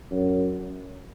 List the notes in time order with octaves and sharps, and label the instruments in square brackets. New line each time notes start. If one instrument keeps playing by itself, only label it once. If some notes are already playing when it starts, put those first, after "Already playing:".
[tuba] F#2